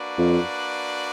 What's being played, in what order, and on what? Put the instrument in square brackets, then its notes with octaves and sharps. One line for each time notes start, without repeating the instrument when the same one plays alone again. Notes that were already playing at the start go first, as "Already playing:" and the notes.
Already playing: [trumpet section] A#3 D4 F#4 B4 D5
[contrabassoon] F2